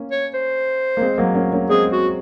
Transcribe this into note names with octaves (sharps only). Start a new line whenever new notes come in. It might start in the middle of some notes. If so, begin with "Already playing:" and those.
Already playing: A#3 C#4
C#5
C5
A#3
G#3 C4
F#3 A#3
A#3 C#4
A#3 C#4
G#3 C4 G#4
F#4